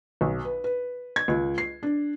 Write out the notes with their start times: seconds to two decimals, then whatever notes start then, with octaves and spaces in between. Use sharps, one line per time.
0.21 B1
0.45 B4
0.64 B4
1.16 G#6
1.28 C#2
1.58 C7
1.83 D4